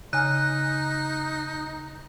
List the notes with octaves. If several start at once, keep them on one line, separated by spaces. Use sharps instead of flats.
C#3 D#4 G#5 F6 F#6